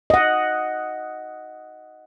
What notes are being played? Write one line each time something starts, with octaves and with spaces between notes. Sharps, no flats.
D#5 F#5